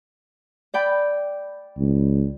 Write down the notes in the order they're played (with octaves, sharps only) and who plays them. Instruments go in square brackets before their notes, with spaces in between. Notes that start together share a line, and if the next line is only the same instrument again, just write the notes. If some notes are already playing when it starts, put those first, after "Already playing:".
[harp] D5 G5 B5
[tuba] C#2